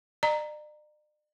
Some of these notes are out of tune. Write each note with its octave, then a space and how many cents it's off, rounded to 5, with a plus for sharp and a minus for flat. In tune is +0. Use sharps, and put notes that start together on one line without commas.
D5 +45 A#5 -5